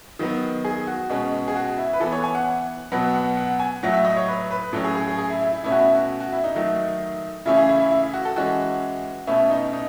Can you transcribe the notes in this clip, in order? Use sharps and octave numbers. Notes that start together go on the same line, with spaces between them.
D#3 F#3 B3
G#4
F#4
B2 G#3 C#4
G#4
F#4
E4
B4
E3 B3 A4
C#5
G#5
F#5
B2 F#3 B3 F#5
F#5
F#5
G#5
A2 F#3 A3 F#5
E5
D#5
C#5
B4
B4
A2 F#3 C#4 A4
G#4
G#4
G#4
G#4
E4
E4
E4
B2 A3 C#4 E4
F#4
E4
F#4
F#4
E4
D#4
D#3 F#3 A3
C#3 E3 A3 C#4 E4
G#4
E4
E4
E4
E4
F#4
A4
E3 G#3 C#4 F#4
B2 A3 C#4 E4
D#4
D#4